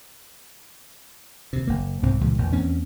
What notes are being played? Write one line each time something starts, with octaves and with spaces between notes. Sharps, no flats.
D#2 C3
F#1 A#3
C2 G#2 C4
C#2 A#2 E3 G#3
A#1 E2 E3 A#3
E2 A#3 C4 C#4